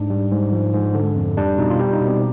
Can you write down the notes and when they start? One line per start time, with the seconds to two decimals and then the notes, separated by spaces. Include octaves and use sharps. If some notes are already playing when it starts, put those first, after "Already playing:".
Already playing: G#2 D4
0.10 G3
0.31 G#2
0.52 F3
0.73 G#2
0.95 D3
1.16 F2
1.37 G3 D4
1.58 B2 D#4
1.70 F4
1.79 G3 G4
1.93 D#4
2.01 B2
2.08 C4